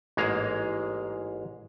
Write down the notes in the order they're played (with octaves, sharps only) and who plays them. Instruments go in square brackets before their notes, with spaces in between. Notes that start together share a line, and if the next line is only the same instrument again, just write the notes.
[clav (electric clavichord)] A1 G#2 G#3 A#3 F5